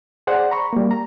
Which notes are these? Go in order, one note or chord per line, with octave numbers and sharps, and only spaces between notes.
G#4 C5 D5 F#5
A#5 B5 C#6
G3 A#3
A#5